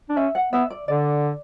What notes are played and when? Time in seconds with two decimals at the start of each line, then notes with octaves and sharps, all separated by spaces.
0.09 D4
0.17 C#4 E5
0.35 F#5
0.53 B3 E5
0.70 D5
0.88 D3 D5